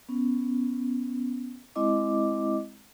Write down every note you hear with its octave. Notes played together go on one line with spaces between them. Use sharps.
B3 C#4
G#3 C4 E4 D#5 D6